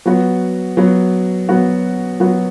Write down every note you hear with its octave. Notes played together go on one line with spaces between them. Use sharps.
F#3 B3 F#4
F#3 B3 F#4
F#3 B3 F#4
F#3 B3 F#4